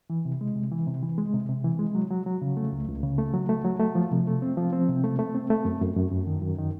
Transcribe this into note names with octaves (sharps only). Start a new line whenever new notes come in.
E3
C3
G#3
C3
E3
C3
E3
G#3
C3
C3
E3
G#3
F#3
F#3
F#3
C#3
A3
C#2
C#2
C#3
A3
F#3
A3
F#3
A3
F3
C3
A3
C4
F3
C4
C3
A3
A3
C4
A3
F#2
F#2
F#2
F#2
D#3
F#2
D#3